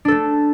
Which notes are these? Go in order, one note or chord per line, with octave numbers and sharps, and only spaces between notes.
A3 D4 A4